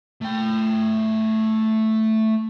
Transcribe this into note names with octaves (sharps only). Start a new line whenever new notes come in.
A3 G5